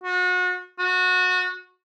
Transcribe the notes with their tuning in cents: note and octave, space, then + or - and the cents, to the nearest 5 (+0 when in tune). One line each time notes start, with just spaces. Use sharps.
F#4 -35
F#4 -20